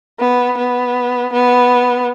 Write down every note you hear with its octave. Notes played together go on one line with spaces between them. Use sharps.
B3
B3
B3